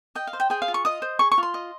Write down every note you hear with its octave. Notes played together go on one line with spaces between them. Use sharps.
D#5 G5
F5
C5
G5
G#4 G5
F5
F4
C#6
D#5 D#6
C5
G#4 C#6
C#6
F4
C6
D#5